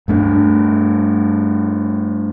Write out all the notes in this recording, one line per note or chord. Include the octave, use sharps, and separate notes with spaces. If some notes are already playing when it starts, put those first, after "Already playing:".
G2 A3 D4